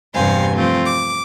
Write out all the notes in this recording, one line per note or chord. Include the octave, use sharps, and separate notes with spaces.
E2 G2 C3 C5 F5 G#5
F3 A3 C4 F4
D6